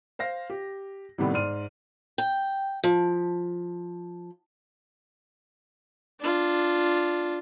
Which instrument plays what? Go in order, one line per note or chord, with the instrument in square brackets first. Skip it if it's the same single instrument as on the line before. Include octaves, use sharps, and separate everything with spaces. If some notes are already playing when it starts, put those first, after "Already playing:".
[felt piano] C5 F5 A#6
G4
A2 C3 D#3 G3 B3
G#2 D5 C6 F6 D#7
[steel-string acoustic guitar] G5
F3
[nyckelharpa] D4 F4